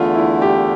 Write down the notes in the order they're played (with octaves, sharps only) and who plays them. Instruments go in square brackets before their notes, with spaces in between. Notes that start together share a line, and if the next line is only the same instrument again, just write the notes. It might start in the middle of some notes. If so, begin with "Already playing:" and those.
Already playing: [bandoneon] E2 D3 A3 [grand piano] F4
[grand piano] E4
G4